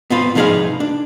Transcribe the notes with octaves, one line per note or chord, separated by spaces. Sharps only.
B3 C4 F4 B4
C2 F3 D#4 G#4 B4 F5
D4